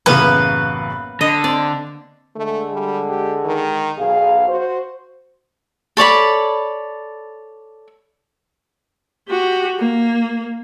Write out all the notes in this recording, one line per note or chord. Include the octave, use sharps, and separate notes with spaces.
A1 F#2 C#3 A#3 B3 B4
D3 D#5
C4 D5
D3 G#3 A3
G3
G4
D#3
B1 G#4 F5
F#4 C5
A4 C#5 D5 B5
F#4 G4
A#3